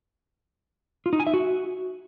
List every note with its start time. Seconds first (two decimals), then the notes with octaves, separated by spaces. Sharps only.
1.06 F4
1.13 D#4
1.20 G#5
1.27 E5
1.34 F#4